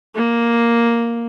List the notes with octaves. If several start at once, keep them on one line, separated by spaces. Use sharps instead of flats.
A#3